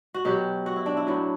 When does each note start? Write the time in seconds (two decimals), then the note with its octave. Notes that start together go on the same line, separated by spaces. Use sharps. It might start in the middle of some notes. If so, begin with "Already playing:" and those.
0.14 F#4
0.25 B2 F#3 G4
0.66 F#4
0.76 E4
0.86 D4
0.97 E4
1.07 A2 F#3